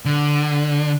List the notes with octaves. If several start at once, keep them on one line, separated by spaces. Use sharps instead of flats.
D3